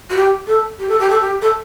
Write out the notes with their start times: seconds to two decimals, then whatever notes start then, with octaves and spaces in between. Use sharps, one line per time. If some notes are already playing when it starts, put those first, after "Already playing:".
0.10 F#4
0.16 G4
0.47 A4
0.79 G4
0.89 A4
0.99 G4
1.09 A4
1.20 G4
1.41 A4